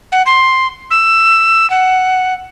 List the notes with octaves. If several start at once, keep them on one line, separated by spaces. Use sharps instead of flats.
F#5
C6
E6
F#5